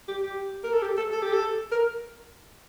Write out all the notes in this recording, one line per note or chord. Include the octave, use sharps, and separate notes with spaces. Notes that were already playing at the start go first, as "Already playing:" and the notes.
G4
G4
A#4
A4
G4
A4
A4
G4
A4
A#4